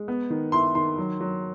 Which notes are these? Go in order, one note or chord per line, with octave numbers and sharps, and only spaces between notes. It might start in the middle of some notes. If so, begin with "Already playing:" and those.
Already playing: G#3
B3
D#3
E4 C6
D#3 C6
F#3
F#3